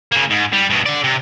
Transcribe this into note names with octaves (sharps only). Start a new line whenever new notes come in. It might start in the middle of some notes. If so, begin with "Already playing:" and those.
C#3 A#3
G#2
G3
G2 B2
D3 D5
C3